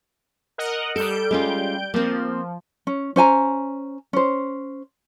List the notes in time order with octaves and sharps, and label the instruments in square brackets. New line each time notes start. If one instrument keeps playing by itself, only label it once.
[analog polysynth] A#4 D#5 F#5
[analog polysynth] G3 G6 D7 [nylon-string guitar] A4
[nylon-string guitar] G#3 C#4 F4
[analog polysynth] F3 [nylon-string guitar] A#3 C4
[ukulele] C#4
C#4 C5 G#5 A#5
C#4 C5